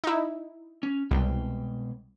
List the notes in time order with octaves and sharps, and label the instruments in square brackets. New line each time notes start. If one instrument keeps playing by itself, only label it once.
[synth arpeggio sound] D#4 E4
[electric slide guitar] C#4
[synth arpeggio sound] C2 [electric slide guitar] B2 G#3 G5